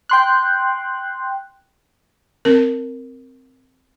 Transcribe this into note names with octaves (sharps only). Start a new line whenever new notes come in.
G5 C6 F#6
C4 A#4